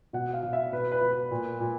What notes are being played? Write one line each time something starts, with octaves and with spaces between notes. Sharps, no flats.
B2 F#5
F5
B2
E5
B2 B4
B4
B2
B4
A#2
A#2